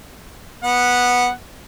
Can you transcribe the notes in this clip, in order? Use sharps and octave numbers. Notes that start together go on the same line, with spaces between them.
B3 F#5